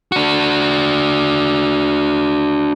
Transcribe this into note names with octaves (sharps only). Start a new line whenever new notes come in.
D4 F#4